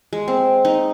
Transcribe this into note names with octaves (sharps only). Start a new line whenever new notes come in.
G#3
C4
D#4